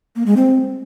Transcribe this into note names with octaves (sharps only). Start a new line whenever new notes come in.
A#3
G#3
C4